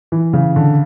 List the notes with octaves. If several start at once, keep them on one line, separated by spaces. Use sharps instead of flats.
E3
C#3
D3